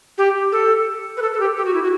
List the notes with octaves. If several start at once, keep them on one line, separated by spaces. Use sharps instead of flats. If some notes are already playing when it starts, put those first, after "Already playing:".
G4
A4
B4
A4
A4
G4
G4
F#4
E4
F#4